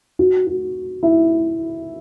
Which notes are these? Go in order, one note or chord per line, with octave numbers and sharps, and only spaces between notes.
F#4
F#4
E4